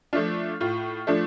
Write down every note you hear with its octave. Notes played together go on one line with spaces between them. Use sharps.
F3 A3 D4 F4
A2 F4
F3 A3 D4